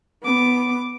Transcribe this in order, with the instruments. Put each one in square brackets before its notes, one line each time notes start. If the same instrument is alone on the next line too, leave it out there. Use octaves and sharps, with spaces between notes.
[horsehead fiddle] B3 [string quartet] D6